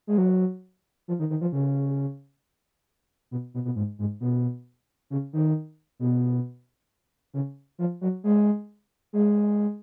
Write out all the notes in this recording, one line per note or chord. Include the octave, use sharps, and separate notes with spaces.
G#3
F#3
F3
D#3
D#3
F3
C#3
B2
B2
B2
G#2
G#2
B2
C#3
D#3
B2
C#3
F3
F#3
G#3
G#3